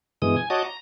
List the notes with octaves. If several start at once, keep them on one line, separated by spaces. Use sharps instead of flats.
G2 B2 E3 G#3 D#6
G#5
F#4 C#5 D#5 A5 D6 D#6
A#5